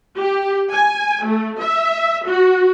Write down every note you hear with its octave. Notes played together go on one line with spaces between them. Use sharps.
G4
G#5
A3
E5
F#4